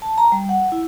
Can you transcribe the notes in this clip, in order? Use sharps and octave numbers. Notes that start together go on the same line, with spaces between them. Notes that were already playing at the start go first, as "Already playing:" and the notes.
A5
A#5
G3
F#5
E4